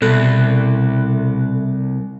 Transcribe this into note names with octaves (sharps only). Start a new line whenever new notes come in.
C2 B2 A4 F#6